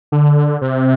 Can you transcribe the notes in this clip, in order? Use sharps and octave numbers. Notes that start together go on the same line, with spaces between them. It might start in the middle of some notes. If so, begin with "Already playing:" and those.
D3
C3